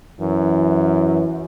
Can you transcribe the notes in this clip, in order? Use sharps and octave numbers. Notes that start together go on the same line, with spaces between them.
F#2 E3